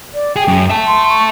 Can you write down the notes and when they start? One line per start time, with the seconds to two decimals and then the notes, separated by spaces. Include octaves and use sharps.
0.14 D5
0.36 G#4 G5
0.48 F#2
0.70 E5 A5
0.87 C6
1.09 C#6